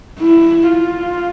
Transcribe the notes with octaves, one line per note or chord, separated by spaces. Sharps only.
E4
F4